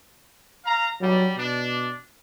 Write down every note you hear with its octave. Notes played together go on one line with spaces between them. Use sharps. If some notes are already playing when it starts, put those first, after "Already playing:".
F5 A#5
F#3 G3
B2 D4